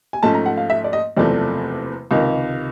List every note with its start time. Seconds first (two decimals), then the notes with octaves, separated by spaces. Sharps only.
0.13 G#5
0.23 G#2 F3 A3 C#4 A5
0.34 A#5
0.46 F#5
0.57 F5
0.70 E5
0.84 D5
0.93 D#5
1.17 F#1 E2 C3 F3 A3 D5
2.11 C#2 C3 D#3